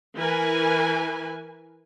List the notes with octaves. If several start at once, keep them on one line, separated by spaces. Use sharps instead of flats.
E3 A#4 B4 G#5